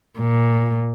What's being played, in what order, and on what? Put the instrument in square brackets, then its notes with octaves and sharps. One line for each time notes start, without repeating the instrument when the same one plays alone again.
[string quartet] A#2